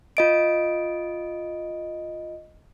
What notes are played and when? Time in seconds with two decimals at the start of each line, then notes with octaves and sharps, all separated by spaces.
0.17 F4 D#5 D7